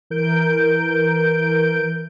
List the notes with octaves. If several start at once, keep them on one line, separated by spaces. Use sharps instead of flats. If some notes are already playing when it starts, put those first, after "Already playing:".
E3 A#4 G6 D7